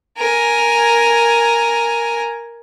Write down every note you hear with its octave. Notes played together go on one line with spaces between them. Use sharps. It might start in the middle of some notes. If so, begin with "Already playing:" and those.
A#4 G#5